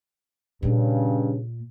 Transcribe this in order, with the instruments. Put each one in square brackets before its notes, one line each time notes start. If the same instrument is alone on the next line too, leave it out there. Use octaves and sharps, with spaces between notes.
[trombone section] G2 C#3 [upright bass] A#2